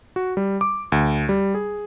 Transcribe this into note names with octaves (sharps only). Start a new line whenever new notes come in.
F#4
G3
D6
D2
G3
G#4